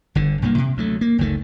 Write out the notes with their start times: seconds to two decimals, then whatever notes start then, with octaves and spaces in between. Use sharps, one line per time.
0.15 G1 D3
0.42 B1 G2 A#2 A#3
0.58 C3
0.77 D2 F#3 A3
1.01 A#3
1.18 F#1 C#2 D#3 A3